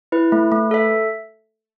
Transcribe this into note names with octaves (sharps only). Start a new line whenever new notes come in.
E4 B4
A3
A3
A4 E5